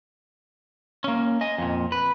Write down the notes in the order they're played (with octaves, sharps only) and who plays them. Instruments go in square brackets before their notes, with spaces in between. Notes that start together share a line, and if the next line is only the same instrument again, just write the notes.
[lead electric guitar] A#3 C#4
D#5 G#5
F2 A#2
B4